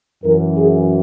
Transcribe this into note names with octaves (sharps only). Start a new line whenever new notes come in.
F#2 E3 A#4
G#4